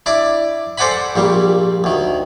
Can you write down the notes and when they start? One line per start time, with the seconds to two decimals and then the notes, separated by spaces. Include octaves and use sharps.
0.06 D4 E4 D5
0.78 A4 C5 D5 F#5 G#5 B5
0.91 F#5
1.16 A#1 A#2 G3
1.84 D2 D#3